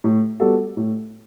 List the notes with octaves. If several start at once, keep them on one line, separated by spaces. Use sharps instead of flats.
A2
G3 B3 F#4 A4
A2